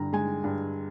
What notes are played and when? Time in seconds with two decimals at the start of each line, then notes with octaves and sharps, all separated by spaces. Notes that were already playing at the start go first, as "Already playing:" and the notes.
Already playing: G2 D3 A#5
0.13 G#3 G#5
0.44 G2